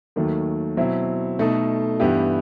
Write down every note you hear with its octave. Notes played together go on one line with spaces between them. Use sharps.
D#2 D#3 F#3 A3
B2 F#3 C4 E4
B2 A3 D#4 A4
G2 E3 B3 E4 G4